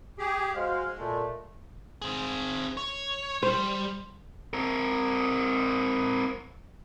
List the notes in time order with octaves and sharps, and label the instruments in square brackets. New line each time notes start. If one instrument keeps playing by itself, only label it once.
[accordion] G4 G#4
[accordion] G#3 [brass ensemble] F#4 C5 F5
[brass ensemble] A#2 A3
[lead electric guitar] C4 G#4
C#5
[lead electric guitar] G3 [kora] C5
[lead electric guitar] C4 A#4